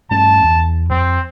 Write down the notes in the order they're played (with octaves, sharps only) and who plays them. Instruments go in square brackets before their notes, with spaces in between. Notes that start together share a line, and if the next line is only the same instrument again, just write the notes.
[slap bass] G2 A3 C#4 [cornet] A5
[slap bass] E2
[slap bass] F2 [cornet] C4